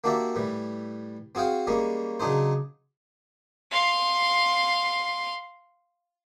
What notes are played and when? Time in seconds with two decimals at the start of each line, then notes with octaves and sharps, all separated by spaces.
0.04 A#3 D4 F#4 G4 D5 E5
0.35 A2 E3 G3
1.35 C4 F#4 G#4 F5 G5
1.67 G3 G#3 A#3 C#4
2.20 C#3 F#3 D4 D#4 C5
3.71 F5 C6